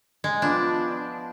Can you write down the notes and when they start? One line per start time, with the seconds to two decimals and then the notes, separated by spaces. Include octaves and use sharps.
0.24 G#3
0.42 F3 B3 D4 G5